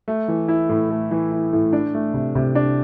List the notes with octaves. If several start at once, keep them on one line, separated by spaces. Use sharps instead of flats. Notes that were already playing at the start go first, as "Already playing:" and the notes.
A3
E3
E4
A2
A3
E3
E4
A2
D4
A3
C3
C3
D4